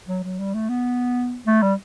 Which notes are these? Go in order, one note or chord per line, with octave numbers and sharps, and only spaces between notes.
F#3
F#3
G3
A3
B3
A3
G3